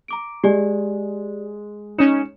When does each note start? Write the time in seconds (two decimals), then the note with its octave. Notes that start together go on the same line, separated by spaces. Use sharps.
0.08 A#5 D6 D7
0.44 G#3 G4 D5 G#5
1.98 C#4 D#4 C#5 C#7 E7